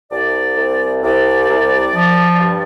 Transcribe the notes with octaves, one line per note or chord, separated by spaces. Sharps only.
C2 D5
C2
C2 D5
C2
F3
G2